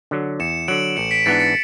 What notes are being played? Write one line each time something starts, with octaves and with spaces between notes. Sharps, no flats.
D3 F#3
E2 C#7 E7
D3 F#3 D7 F#7
A1 C#7 E7
B6 D7
G#2 E3 B3 D4 A6 C#7
A6 C#7